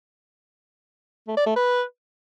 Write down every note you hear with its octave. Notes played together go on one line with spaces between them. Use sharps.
A3
D5
A3
B4